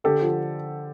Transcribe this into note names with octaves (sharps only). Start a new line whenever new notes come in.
D3 G4 A4
F3